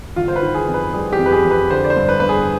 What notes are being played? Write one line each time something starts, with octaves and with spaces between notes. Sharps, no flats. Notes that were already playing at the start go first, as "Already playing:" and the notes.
G1 F4
C5
B4
D#3
G#4
F2
B4
G3 G#4
G4
F2
B4
G#4
F2
B4
D3 C5
D5
C5
G2
B4
G2 B4
G#4